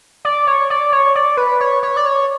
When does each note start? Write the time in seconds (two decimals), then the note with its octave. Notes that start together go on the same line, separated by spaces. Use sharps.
0.25 D5
0.47 C#5
0.70 D5
0.92 C#5
1.15 D5
1.37 B4
1.60 C#5
1.83 C#5
1.97 D5
2.05 C#5